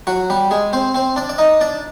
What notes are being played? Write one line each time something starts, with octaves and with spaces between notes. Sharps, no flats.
F#3 F#4
G3 G4
G#3 G#4
C4 C5
C4 C5
D4 D5
D5
D#4 D#5
D4 D5